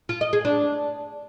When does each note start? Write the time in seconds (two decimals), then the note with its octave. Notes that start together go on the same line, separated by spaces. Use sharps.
0.09 F4
0.21 D#5
0.33 G#4
0.45 D4